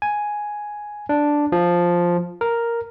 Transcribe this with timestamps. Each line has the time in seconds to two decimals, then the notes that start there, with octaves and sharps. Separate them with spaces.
0.02 G#5
1.09 D4
1.52 F3
2.41 A#4